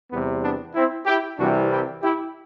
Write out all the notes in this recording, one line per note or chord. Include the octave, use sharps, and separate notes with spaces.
E2 C3 G3 B3
B3 D4
C4 E4
E4 G4
C2 C3 E3 G3 D4 F#4
E4 G4
E4 G4